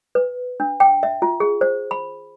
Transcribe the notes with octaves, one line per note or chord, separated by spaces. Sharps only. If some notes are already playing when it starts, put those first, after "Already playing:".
B4
D4
G5
E5
F4
G#4
C5
B5